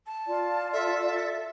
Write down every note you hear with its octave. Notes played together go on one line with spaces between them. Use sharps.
A5
F4 D5
A4 E5